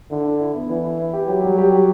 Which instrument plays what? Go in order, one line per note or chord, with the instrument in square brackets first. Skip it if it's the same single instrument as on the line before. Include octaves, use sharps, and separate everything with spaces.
[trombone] D3 [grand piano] E4
[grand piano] E4
E4
B3
[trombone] E3 [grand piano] E4
[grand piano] E4
E4
G4
[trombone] F#3 [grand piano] G4
[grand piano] G3
G4
G4